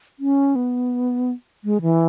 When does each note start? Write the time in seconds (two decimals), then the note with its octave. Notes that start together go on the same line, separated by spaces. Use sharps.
0.19 C#4
0.56 B3
1.64 G#3
1.82 E3